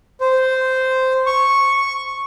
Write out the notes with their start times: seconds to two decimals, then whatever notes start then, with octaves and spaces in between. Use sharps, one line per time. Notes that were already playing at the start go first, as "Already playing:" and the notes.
0.21 C5
1.26 C#6